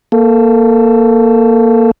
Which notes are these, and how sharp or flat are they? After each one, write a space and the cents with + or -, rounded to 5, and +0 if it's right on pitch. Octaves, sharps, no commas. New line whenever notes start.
A#3 +5 A4 +0